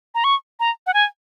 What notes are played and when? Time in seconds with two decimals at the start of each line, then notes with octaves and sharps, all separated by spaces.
0.15 A#5
0.24 C#6
0.60 A#5
0.87 F#5
0.94 G#5